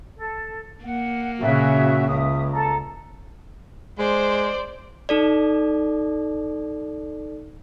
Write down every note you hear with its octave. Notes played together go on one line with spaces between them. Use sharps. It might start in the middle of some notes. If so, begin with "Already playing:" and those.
A4
A#3 F#5
A#2 C#3 C#4 F#4 E5
C#2 E5 D#6
A4 A#5
G#3 C5 D5
D#4 A4 D5